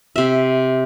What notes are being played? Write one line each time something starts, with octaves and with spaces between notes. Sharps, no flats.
C3 E5